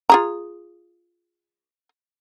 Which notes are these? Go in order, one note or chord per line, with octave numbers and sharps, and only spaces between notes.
F4 G#4 A#5